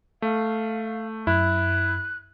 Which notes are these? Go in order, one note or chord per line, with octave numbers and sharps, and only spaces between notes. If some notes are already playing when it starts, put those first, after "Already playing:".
A3 F5
F#2 E4 F#6